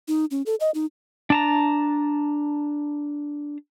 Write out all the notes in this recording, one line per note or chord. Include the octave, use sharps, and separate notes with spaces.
D#4
C#4
A4
D#5
D#4
D4 A5 A#5